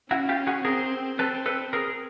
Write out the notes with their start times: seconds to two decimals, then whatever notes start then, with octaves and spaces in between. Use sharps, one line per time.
0.10 C#4 E4 F#4
0.29 F4 G4
0.47 F#4 G#4
0.65 C4 G#4 A#4
1.19 C4 A4 B4
1.46 A4 B4
1.73 G#4 A#4